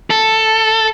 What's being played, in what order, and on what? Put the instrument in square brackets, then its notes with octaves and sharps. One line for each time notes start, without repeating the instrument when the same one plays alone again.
[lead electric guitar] A4